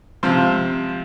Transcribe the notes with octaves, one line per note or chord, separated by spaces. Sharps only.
C3 F3 C4